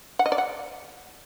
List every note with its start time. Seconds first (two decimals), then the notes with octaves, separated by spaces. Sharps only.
0.19 F#5
0.26 D#5
0.32 D5
0.38 F#5